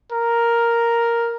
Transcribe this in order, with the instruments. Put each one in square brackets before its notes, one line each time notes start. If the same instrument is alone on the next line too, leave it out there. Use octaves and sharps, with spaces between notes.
[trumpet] A#4